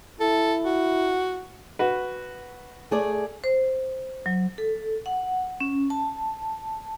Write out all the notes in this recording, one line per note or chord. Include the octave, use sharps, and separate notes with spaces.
E4 A4
F#4
F#4 B4
A3 G#4 D5
C5
F#3
A4
F#5
C#4
A5